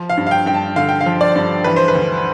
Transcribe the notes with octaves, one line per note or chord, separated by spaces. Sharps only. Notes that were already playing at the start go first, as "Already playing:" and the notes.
Already playing: F3
F5
G2
F5
G5
G2 G5
A5
D3 F5
G5
F5
F3
D5
G2
E3 B4
C5
B4
D2